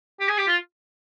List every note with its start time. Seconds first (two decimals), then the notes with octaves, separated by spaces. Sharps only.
0.20 G4
0.29 G#4
0.38 G4
0.48 F4